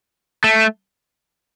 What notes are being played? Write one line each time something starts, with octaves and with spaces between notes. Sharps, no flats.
A3